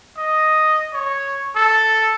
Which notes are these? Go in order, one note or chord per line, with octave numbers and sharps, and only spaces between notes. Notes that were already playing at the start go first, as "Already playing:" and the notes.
D#5
C#5
A4